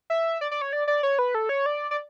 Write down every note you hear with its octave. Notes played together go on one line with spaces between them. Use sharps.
E5
D5
D5
C#5
D5
D5
C#5
B4
A4
C#5
D5
D5